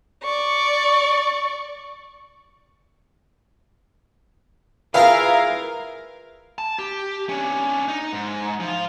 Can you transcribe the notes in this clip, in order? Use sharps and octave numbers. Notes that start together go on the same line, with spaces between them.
D5 C#6
E4 F4 G#4 A#4 B4 E5 F5
A5
G4
C#4 D4
D#4
G#2
F3 F4